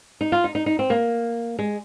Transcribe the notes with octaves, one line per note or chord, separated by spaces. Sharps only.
D#4
F4
D#4
D#4
D#4
C4
A#3
G#3